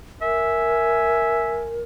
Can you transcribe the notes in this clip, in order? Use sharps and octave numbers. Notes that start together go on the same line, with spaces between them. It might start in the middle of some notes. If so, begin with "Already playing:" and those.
A#4 E5 G#5